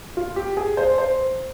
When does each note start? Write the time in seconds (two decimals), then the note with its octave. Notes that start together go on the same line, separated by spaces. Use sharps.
0.17 F4
0.36 G4
0.57 G#4
0.77 C5
0.98 C5